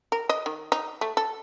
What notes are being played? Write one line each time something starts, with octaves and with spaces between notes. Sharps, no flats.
A#4
D#5
D#3
D#4
A3
A4